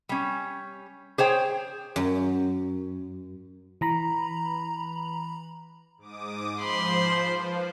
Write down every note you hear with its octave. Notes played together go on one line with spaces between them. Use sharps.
G3 C#4
G#4 C5 C#5 G5
F#2
E3 A#5 B5
G#2 D6 D#6
F3 C5 B5 C6
F3 B4